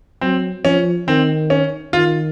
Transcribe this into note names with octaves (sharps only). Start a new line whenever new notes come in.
F#3 C4
F3 C#4
D#3 C4
C#4
D#3 F4